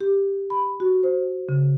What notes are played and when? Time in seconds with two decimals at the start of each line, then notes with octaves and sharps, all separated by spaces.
0.01 G4
0.50 B5
0.80 F#4
1.03 C5
1.49 C#3